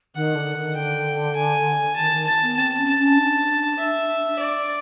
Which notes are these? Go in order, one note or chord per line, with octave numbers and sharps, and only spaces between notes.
D#3 F#5
D3
D#3
D3 G5
G#5
D#3 A5
D#3
A5
B3
C4 A5
C#4
A5
C#4
D4
E5
D5